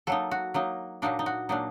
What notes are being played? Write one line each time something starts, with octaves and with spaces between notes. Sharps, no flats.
F#3 A#3 D#4 A4
F#4
F#3 A#3 D#4
A#2 F#3 A#3 D4 D#4
D#4
F#4
A#2 F#3 A#3 D4 D#4